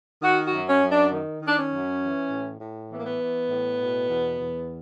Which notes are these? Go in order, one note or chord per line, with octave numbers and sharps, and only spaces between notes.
D#3 F#4
F#4
F#2
C#4
F#2
D4
D#3
D#3 D4
C#4
F#2
E3
A2
A2
E3 B3
A#3
B3
E3
A2
B2
E2
E2